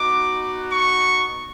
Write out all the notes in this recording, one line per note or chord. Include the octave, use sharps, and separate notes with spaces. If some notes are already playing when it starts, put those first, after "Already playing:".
Already playing: B3 D#4 F#4 D6
C#6